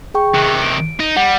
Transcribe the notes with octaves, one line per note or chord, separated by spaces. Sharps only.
G#4 G5 C#6
C3 D#3 F#6 C#7
D7
D#4
G3 F#5